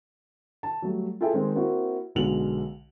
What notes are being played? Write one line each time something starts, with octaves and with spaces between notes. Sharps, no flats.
A5
F#3 G3 A3
F4 G#4 A4 E5 G5
D#3 G#3 C4
A#3 C4 E4 F#4
B1 B2 D3 G#3 F7 F#7